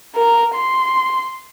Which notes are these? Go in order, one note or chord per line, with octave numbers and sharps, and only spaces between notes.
A#4
C6